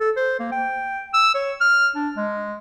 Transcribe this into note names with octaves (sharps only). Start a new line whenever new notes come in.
A4
C5
A#3
G5
E6
C#5
F6
D4
G#3